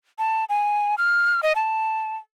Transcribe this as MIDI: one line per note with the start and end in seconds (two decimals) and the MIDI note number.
0.19 0.45 81
0.49 0.95 80
0.98 1.41 89
1.43 1.53 75
1.55 2.17 81